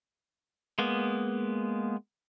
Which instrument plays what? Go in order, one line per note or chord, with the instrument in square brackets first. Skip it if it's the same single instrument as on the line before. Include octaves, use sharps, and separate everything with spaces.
[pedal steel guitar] G#3 A#3 B3